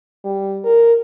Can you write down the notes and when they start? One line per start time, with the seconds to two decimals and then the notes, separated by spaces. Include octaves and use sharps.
0.25 G3
0.64 A#4